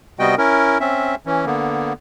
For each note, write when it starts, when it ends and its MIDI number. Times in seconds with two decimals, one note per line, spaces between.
0.19 0.35 48
0.19 0.35 55
0.19 0.35 59
0.19 0.35 66
0.19 0.35 75
0.19 0.35 79
0.38 0.78 61
0.38 0.78 64
0.38 0.78 70
0.80 1.15 60
0.80 1.15 61
0.80 1.15 76
1.26 1.45 52
1.26 1.45 61
1.46 1.93 50
1.46 1.93 58
1.46 1.93 59